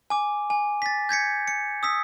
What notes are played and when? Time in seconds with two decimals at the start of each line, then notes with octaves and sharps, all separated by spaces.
0.10 G#5 D6
0.50 G#5
0.82 A6 B6
1.09 G6 G#6 B6 C#7
1.48 C#7
1.83 D#6 E6 B6